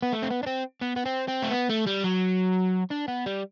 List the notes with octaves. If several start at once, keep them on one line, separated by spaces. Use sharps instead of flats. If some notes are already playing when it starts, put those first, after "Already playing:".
B3
A3
C4
B3
D4
C4
B3
B3
C4
C4
A3
B3
A3
G3
F#3
D4
B3
G3